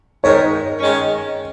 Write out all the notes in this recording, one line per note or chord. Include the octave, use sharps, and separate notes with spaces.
G#2 D#3 G#3 D#4 A#4 C#5
D#3 G#3 C#4